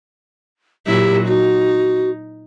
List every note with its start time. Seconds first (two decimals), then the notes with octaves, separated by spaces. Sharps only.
0.87 A#2 F#3 E4 G4
1.28 D#4 F#4